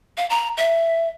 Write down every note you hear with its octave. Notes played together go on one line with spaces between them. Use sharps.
F5
A#5
E5